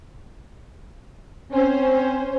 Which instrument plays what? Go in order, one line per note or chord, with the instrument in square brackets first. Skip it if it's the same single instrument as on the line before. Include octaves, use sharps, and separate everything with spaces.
[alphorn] C4 [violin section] C#4 C5